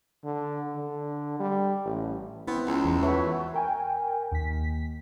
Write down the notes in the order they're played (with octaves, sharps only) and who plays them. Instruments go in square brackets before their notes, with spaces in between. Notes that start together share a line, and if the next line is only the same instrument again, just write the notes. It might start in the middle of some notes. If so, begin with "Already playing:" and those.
[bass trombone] D3
D3
G3
A1
[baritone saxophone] B3 [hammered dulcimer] C4 [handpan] E4
[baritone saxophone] C#2 [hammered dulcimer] A#5 B5
[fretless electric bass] E2
[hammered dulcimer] A3 F#4 A4 [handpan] B4 C#5 E5
[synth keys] A#4 G5 G#5
D#2 B6